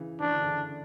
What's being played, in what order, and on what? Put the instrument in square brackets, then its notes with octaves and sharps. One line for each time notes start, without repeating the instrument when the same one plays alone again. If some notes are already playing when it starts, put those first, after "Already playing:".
Already playing: [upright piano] C#3 E3
[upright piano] E3 [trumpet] D4
[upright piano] D3
C#3 E3